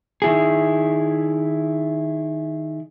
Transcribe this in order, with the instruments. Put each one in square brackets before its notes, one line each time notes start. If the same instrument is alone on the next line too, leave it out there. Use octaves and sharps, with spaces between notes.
[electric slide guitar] D#3 E4 G#4